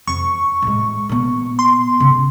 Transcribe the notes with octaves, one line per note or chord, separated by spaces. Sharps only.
F2 C#6
A2 G#3
A#2 B3
C6
C#3 F4